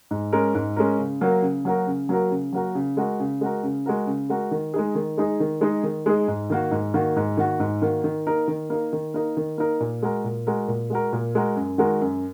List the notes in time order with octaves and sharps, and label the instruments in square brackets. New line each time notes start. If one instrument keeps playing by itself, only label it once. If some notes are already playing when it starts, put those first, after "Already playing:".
[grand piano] G#2
G#3 C#4 A#4
G#2
G#3 C#4 A#4
C#3
F#3 A#3 F#4 A#4
C#3
F#3 A#3 F#4 A#4
C#3
F#3 A#3 F#4 A#4
C#3
F#3 A#3 F#4 A#4
C#3
G#3 F#4 A#4
C#3
G#3 F#4 A#4
C#3
G#3 F#4 A#4
C#3
G#3 F#4 A#4
D#3
G#3 D#4 G#4
D#3
G#3 D#4 G#4
D#3
G#3 D#4 G#4
D#3
G#3 D#4 G#4
G#2
D#3 A#3 F#4
G#2
D#3 A#3 F#4
G#2
D#3 A#3 F#4
G#2
D#3 A#3 F#4
D#3
A#3 D#4 A#4
D#3
A#3 D#4 A#4
D#3
A#3 D#4 A#4
D#3
A#3 D#4 A#4
A#2
G#3 F#4 A#4
A#2
G#3 F#4 A#4
A#2
G#3 F#4 A#4
A#2
G#3 F#4 A#4
F#2
D#3 G#3 F#4 A#4
F#2